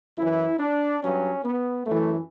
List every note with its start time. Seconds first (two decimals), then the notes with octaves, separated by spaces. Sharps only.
0.18 F#2 E3 E4
0.60 D4
1.02 G2 F#3 C#4
1.44 B3
1.86 F#2 E3 A3